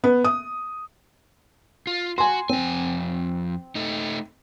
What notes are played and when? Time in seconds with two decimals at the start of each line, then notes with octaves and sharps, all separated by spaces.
0.04 B3
0.24 D#6
1.87 F4
2.18 F#4 G#5 C6
2.49 F2 C4 G#5
3.75 A3 D#4